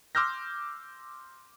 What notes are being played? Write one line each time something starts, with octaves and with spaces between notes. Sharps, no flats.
C6 D6 E6 F6 G6 A#6